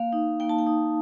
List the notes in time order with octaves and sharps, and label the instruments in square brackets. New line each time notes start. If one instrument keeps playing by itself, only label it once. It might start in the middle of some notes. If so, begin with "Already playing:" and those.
Already playing: [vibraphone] A#3 F5
D#4
A#3 G5
A5
G5
D#4